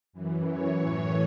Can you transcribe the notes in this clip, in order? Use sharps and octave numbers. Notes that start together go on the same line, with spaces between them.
F#2 E3
F#2 E3 C#5
A2 E3